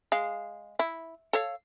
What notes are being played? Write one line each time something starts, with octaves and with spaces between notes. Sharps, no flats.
G#3 F5
E4
A4 C#5 F5